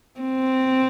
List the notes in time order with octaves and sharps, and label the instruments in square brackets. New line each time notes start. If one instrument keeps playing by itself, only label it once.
[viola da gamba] C4